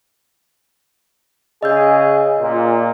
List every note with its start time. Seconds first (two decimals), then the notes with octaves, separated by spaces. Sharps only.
1.63 C#3 G#4 D#5 E6 G6
2.40 A#2